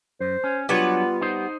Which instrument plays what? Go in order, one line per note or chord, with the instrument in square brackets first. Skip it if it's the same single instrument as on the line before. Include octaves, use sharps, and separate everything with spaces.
[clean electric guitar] F#2 [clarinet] C5
[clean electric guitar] C#4
[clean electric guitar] F#3 D4 C#5 [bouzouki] G3 B3 B4 [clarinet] F4
[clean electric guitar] D#4 C5